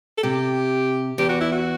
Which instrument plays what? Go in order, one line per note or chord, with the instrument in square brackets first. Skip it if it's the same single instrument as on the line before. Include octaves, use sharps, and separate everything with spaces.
[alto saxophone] A4
[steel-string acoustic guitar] C3 [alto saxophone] G4
[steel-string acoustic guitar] E2 [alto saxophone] G4
[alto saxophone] F#4
E4
F#4